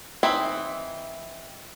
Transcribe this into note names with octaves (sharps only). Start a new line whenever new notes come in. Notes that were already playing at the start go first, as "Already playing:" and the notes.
E3 C4 D#4 E4